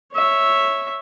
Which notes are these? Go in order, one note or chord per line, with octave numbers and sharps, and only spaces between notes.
C#5 E5